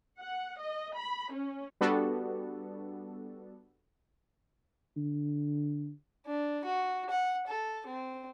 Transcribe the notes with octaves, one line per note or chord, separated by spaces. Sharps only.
F#5
D#5
B5
C#4
G3 B3 D4 F#4 A4
D3
D4
F#4
F#5
A4
C4